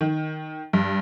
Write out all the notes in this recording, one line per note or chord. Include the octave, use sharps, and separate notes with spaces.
D#3
G2